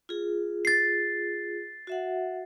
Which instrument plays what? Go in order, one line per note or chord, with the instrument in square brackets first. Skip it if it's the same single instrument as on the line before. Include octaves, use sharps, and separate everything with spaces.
[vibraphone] F4 G#4
[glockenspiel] A6 C7
[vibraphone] F#4 E5 F#5